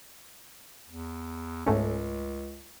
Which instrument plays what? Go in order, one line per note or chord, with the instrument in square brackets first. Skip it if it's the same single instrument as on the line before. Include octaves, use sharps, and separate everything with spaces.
[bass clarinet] E2
[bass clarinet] C#2 [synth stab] G#2 A3 C#4